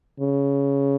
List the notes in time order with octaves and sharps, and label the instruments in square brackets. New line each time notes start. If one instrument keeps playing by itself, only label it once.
[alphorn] C#3